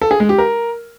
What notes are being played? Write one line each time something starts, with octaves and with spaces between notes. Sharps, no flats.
A4
G#4
G#3
G4
A#4